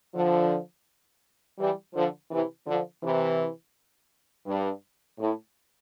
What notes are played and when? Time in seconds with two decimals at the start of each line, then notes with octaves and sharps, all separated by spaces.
0.14 D3 F3
1.58 E3 G3
1.94 D3 F3
2.30 C3 E3
2.66 D3 F3
3.03 C3 E3
4.46 G2
5.19 A2